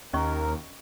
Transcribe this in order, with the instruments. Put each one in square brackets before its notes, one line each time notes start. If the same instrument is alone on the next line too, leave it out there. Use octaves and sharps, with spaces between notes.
[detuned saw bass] D#2 [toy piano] C#4 D#5 C#6 [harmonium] A#4